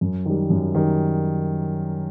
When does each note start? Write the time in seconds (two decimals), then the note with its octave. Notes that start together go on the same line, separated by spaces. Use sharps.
0.01 F#2
0.25 D#3 G3
0.50 F#2
0.74 D#3 G3